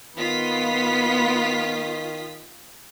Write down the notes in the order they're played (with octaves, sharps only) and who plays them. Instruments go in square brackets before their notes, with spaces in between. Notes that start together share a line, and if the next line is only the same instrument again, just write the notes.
[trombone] D#3 [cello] B3 [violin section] F4 D#6 B6